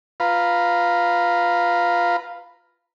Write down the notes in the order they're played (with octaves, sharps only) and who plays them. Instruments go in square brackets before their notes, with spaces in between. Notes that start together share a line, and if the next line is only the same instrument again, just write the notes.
[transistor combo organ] F4 B4 F5 A#5 B5